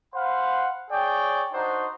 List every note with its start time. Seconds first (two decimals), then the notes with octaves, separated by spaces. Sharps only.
0.14 C5 F5 F#5 B5
0.91 G#4 C#5 D5 G5
1.53 D4 D#4 F#4 C5